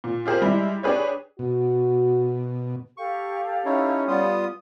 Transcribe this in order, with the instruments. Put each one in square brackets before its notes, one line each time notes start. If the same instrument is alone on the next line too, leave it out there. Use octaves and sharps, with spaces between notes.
[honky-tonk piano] A#2
F4 G4 G#4 A#4 C5
G3 G#3 E4
D4 G4 G#4 B4 C#5
[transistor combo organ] B2 [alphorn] F#4
[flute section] G4 A4 F5 [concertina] C#6
[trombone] C#4 [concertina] D#4 E4 C#5
[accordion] G3 B3 F4 [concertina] D#6